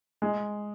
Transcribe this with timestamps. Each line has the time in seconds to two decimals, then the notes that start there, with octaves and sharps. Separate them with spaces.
0.22 G#3